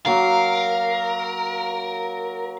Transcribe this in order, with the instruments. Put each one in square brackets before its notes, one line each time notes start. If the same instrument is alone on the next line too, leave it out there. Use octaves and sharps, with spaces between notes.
[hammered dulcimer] F#3 A#3 [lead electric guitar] A#4 [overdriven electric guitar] F5